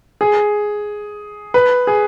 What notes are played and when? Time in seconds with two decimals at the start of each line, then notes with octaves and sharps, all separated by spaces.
0.21 G#4
1.54 B4
1.87 G#4